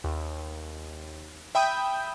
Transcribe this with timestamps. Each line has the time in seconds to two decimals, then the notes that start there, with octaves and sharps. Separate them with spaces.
0.04 D#2
1.55 E5 G5 B5 D#6 G6 D#7